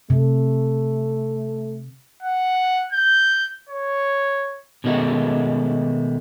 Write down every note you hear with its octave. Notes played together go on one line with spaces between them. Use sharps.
C3 A3
F#5
G6
C#5
B2 D#3 G#3 A3 F#4